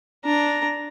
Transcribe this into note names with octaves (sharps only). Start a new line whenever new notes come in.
D4 A#5